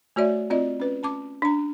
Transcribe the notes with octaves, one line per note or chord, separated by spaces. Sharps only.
A3 F#4 C#5 D5 E5
C4 F4 D5 D#5
C#4 B4
C#4 A5 D6
D4 A#5